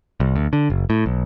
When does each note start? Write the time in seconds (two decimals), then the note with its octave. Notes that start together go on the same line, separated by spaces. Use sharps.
0.20 C2
0.35 D2
0.53 D3
0.70 F#1
0.90 A2
1.06 B1